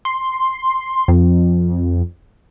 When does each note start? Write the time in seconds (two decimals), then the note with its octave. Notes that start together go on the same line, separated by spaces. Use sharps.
0.05 C6
1.08 F2